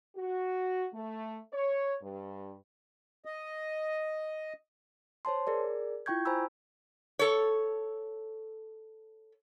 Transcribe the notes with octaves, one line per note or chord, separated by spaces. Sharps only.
F#4
A3
C#5
G2
D#5
C5 C#5 A5 C6
G#4 A#4 D5
E4 F4 G5 C#6 G6 G#6
C5 G#5 A#5 B5 E6
A4 C#5